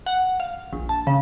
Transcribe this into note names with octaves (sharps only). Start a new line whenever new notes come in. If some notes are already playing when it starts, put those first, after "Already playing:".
F#5
F5
A#1
A5
C#3